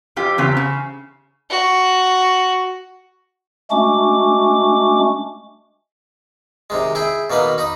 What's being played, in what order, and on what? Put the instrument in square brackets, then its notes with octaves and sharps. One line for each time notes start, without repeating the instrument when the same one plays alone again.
[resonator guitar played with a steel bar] F2 F4 G4
E2 C#3 C4 G4
C#3
[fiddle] F#4
[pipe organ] G#3 A3 C#4 D4 F#4 D6
[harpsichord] C3 D#3 G#3
E4 G#4 G5
B2 D#3 A#3 B4 B5
D#4 B5 D#6